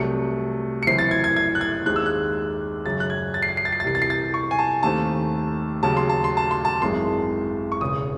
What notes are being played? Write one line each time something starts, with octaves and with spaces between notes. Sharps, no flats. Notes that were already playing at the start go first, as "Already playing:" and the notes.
Already playing: C2 C3 F#3 A3 C#7
C#7
F#1 F#2 E3 C4 C7
A6
G#6
G#6
G#6
F#6
G#6
D#2 D#3 G#3 C4 F#6
E6
F#6
F#2 C#3 F#3 A6
F#6
G#6
A6
C7
A6
C7
A6
C7
A6
C2 C3 E3 C7
A6
C7
A6
C#6
G#5
A5
D#2 D#3 A3 C4 A5
D#2 C#3 F#3 A5
C6
A5
C6
A5
C6
A5
G#1 F#2 E3 G#3 C6
C#6
E1 E2 C#3 D#6